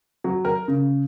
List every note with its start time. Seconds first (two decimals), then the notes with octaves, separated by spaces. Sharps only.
0.24 F#3
0.45 A#4
0.68 C#3